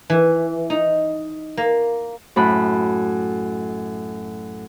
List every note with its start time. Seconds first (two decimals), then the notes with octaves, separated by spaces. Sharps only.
0.10 E3
0.70 D#4
1.57 A#3
2.36 F#2 A2 B5 F#6